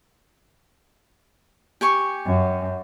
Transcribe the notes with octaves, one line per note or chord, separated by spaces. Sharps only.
G4 G#5 C#6
F#2